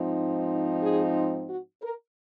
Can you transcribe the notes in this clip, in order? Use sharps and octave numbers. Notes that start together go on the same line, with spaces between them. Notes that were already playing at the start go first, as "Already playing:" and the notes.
Already playing: G#2 F3 C4 D#4
G#4
F#4
A#4